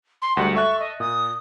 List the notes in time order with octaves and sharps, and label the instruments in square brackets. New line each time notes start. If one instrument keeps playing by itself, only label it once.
[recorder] C6
[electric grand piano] D2 G3 G#3 [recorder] F#5
[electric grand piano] A4 E5 F#6 [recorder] C#6
[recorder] D#5
[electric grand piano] A#2 [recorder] D#6